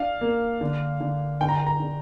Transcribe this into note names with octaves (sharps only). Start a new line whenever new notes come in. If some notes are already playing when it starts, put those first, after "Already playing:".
Already playing: D4 F5
A#3
D3
D3
D3 G5
A#5
G5
A#5
D3